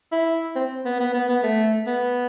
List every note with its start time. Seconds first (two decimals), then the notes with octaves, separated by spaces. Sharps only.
0.12 E4
0.56 C4
0.86 B3
1.00 B3
1.14 B3
1.29 B3
1.43 A3
1.87 B3